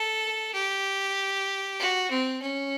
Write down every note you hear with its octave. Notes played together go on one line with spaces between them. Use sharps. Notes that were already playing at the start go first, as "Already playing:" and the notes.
Already playing: A4
G4
F#4
C4
C#4